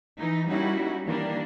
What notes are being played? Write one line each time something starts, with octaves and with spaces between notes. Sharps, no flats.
E3 D#4
G3 A#3 C#4 D#4 E4 F#4
D#3 E3 G3 A#3 D4